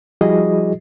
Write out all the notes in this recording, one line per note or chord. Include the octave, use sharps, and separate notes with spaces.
F3 G3 E4 F#4 G#4 D#5